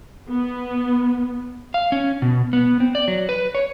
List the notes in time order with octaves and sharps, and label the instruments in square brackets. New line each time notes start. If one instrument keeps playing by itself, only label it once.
[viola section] B3
[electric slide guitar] F5
C#4
B2
B3
C4
D5
F#3
B4
C#5